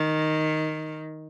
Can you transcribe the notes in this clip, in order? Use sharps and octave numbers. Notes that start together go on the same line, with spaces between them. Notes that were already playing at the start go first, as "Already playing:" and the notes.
Already playing: D#3